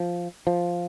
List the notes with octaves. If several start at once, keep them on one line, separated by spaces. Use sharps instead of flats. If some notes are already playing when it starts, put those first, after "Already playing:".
Already playing: F3
F3